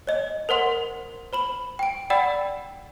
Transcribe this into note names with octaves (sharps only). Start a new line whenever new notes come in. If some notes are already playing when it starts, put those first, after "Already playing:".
C#5 D#5
A#4 C5 F#5 C6
C5 B5 F#7
G5 D7
D5 F#5 G5 B5 E6 A6